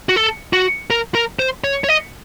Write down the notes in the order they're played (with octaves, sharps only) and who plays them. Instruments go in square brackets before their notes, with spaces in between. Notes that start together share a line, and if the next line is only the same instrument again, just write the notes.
[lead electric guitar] F#4
A4
F#4
A#4
A#4
C5
C#5
C#5
D#5